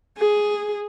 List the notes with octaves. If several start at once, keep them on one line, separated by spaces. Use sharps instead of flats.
G#4